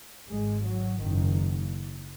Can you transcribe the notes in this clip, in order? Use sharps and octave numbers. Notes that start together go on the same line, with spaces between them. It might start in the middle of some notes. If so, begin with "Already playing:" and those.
G#1 G#2 G#3
F#3
F#1 F#2 D#3